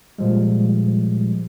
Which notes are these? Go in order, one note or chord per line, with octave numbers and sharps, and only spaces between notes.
A#2 F3 G3 G#3